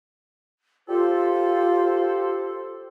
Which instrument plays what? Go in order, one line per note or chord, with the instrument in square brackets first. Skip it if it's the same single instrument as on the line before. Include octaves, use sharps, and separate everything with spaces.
[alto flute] F4 [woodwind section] G4 A4 C5